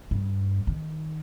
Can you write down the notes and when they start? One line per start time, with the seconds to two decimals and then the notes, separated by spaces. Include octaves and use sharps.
0.11 G2
0.67 D#3